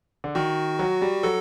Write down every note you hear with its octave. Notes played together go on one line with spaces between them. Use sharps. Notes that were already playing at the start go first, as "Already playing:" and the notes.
D3
D#3 F#4
F#3
G3
F#3 A4